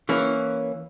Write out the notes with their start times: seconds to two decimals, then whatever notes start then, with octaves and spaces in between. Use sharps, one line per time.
0.09 E3 A#3 C#4